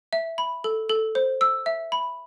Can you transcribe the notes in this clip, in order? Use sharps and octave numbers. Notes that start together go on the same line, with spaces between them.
E5
B5
A4
A4
C5
E6
E5
B5